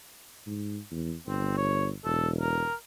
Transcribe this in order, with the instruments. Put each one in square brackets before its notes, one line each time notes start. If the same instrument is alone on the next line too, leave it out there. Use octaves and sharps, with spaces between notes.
[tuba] G#2
E2
[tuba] G1 [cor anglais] C4
[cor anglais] C#5
[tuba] E1 [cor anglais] A4
[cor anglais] A#4